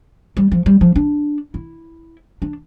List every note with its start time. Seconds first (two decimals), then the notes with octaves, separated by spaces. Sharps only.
0.37 G3
0.52 F3
0.66 G3
0.81 F3
0.96 D4
1.54 E4
2.42 D4